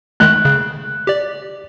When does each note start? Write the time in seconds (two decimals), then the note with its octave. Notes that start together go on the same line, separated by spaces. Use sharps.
0.20 D#3 G#3 A3 F#6
0.45 C#3
1.07 G4 D5